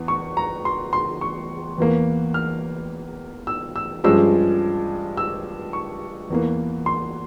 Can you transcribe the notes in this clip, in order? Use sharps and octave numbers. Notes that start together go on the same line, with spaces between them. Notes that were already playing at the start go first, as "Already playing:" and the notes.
Already playing: E2 E3
C#6
A#5
C6
C6
C#6
E2 E3 A#3
F6
E6
E6
G2 F3 G#3 C#4 E6
E6
C#6
E2 E3 A#3
C6